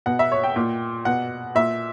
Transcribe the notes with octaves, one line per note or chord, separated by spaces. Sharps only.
B2 F#5
E5
C#5
G5
A#2
B2 F#5
A#2 E5